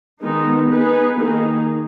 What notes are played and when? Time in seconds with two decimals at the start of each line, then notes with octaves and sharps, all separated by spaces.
0.21 D#3 G#3 B3 D#4
0.70 B3 D#4 G#4 B4
1.19 D#3 A#3 D#4 G#4